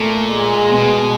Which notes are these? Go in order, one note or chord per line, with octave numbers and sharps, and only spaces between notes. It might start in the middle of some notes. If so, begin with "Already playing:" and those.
Already playing: A#2 A3
G#3
B2